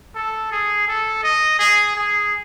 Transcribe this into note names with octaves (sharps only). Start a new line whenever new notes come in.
A4
G#4
A4
D#5
G#4
G#4